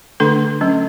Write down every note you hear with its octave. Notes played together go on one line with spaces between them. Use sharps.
D3 A3 D4 A4
F#3 C#4